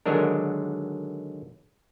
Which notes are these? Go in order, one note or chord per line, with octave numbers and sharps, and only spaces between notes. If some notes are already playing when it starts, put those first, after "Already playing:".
D3 D#3 F#3 G#3 D4 A#4